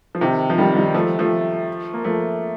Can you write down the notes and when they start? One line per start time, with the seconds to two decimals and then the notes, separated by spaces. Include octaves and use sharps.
0.15 F3
0.21 C3 D#3
0.50 F3
0.58 D#3 G3
0.76 D#3 G3
0.95 F3 A3
1.19 F3 A3
1.94 A#3
2.04 F3 A3